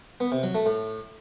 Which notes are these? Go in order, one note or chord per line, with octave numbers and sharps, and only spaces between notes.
B3
C3
F#3
A3
A2